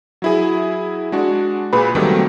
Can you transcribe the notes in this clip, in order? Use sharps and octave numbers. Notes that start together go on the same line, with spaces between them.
F#3 E4 G#4
G#3 D4 F#4
A#2 G#4 B4 B5
D#3 F#3 G3 A3 A#3 C4